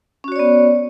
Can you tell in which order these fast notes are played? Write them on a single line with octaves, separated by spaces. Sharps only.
C#4 F#4 C#5 D5 B3